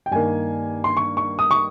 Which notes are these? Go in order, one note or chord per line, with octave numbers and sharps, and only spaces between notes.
G5
G2 D#3 A#3 G#5
C6
C#6
C#6
D#6
C#6